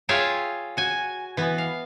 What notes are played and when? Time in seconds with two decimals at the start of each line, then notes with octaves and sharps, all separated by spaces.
0.09 F4 G#4 C#5 E5 F5 G5
0.77 F#4 G#5
1.37 E3 B3
1.58 F5